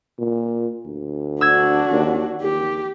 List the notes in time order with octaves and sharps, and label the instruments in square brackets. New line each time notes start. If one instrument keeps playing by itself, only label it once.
[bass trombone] A#2
D2
[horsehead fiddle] D4 F#4 [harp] E6 G#6
[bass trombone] D#2
[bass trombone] D#2 [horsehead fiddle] G4